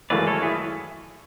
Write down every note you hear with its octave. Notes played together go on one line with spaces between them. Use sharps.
G#1 F#2 C#3 E3 A3 B4 D5
A4 C#5
E4 G#4